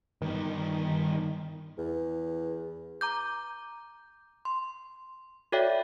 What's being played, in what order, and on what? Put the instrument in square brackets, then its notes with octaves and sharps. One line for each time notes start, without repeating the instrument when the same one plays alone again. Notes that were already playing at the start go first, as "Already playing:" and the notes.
[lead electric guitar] G2 B3 [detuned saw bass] D#3
[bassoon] E2
[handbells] A#5 D6 G6
C6
F#4 A4 C#5 D5 E5 G5